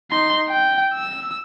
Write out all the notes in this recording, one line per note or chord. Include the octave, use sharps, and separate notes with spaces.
D#4 C6
G5
E6